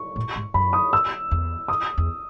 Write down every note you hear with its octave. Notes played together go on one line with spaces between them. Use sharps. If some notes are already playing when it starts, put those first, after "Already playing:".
Already playing: C#6
A2
G#2
F#2 B5
D#6
E6
E2
D#6
E2